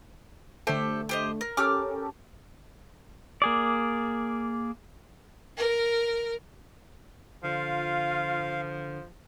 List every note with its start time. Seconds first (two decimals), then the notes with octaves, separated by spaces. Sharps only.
0.67 D3 A3 G4 A4 C5
1.09 G4 C5 D#5
1.41 A#4
1.57 C#4 G4 A4 A#4 D6 F6
3.42 A#3 G#4 D5
5.57 A#4
7.43 D3 F3 F4 F5